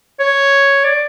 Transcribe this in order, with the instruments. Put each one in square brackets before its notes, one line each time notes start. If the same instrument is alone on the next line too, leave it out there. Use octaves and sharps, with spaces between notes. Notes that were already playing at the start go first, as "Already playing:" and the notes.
[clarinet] C#5
D5